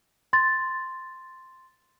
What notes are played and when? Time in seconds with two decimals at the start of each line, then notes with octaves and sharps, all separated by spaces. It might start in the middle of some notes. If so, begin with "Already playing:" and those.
0.33 C6 A6